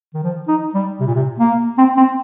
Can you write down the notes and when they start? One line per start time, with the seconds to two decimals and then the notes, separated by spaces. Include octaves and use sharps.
0.14 D#3
0.23 F3
0.48 D#4
0.74 G3
1.00 C3
1.07 A#2
1.15 C3
1.39 A#3
1.78 C4
1.97 C4